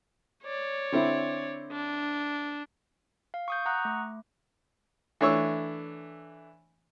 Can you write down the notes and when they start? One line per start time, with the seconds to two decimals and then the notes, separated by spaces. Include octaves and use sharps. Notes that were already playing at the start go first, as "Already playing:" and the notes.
0.44 C#5 D5
0.92 D3 C4 E4
1.72 D4
3.34 F5
3.48 C#6 D#6 G6
3.65 F#5 A#5 C#6 D#6 F#6
3.85 A3
5.21 E3 A3 D4 C#5 C#6 E6